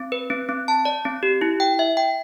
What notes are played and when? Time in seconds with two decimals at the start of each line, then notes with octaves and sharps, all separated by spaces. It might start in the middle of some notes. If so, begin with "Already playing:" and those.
Already playing: C4
0.12 B4
0.30 C4
0.49 C4
0.68 A5
0.85 D5
1.05 C4
1.23 G4
1.41 E4
1.60 G5
1.79 E5
1.97 G5